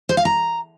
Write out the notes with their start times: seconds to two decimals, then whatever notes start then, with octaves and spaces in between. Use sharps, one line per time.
0.09 C5
0.17 F5
0.25 A#5